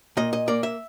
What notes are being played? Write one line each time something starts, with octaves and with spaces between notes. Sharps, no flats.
A#2 D#5
D#5
A#3 D5
E5